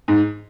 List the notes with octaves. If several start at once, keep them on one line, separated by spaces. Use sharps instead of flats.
G#2